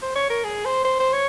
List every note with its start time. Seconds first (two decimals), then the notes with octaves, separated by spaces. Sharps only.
0.02 C5
0.15 C#5
0.30 A#4
0.44 G#4
0.65 C5
0.85 C5
1.00 C5
1.13 C#5